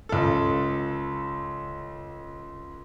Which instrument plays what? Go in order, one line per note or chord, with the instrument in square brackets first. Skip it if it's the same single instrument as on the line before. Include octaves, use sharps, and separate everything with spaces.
[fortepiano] C#2 A4